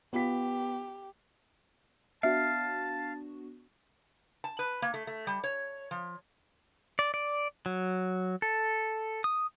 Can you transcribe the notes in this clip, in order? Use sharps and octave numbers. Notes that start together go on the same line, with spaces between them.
B3 F4 G4 B6
B3 D4 F#4 E5 F5 A5
A5
B4
A#3
A3
A3
G3
C#5
F3
D5
D5
F#3
A4
D#6